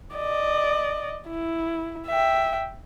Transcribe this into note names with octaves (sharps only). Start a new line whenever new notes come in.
D5 D#5
E4
E5 G5